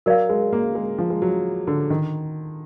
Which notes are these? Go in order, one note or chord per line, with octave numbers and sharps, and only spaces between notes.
F#3 A#4 D5 F5
G#3
A#3
G#3
F3
G#3
F#3
D3
D#3